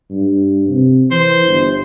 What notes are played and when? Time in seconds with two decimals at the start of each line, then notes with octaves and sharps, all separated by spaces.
0.10 G2
0.68 C3
1.11 E3 C5
1.46 G1